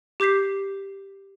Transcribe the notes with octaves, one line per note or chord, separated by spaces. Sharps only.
G4 D6 G6 B6 C7